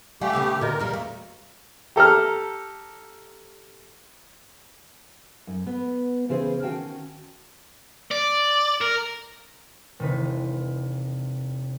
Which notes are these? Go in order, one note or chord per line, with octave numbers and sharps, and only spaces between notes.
G3 A3 G4 F5 F#5 G#5
A#2 C#3 B3
A#2 D3 F#4 A#4 D#5
E2 A#2 G3
A3 F5
G4 A4 A#5 F6
F#2
B3
E2 C#3 E3 G#4 C5
D#3 C#4 F#4 F5 G5 A5
D5
A#4
E1 C3 D#3 B4